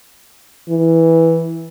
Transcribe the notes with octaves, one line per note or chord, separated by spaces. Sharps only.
E3